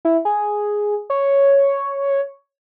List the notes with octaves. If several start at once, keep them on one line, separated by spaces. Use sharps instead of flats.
E4
G#4
C#5